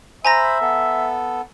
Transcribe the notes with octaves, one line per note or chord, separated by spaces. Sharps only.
C5 E5 G#5 A#5 B5 A#6
B3 A4